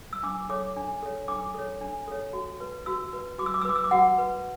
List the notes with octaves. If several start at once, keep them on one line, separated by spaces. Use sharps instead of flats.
E6
D4 D6
A4 C#5 D6
D4
A4 C#5
D4 D6
A4 C#5
D4
A4 C#5
F#4
B4
F#4 E6
B4
F#4 D6
E6
D6
E6
B4 D6
E6
D6
F#4 F#5
B4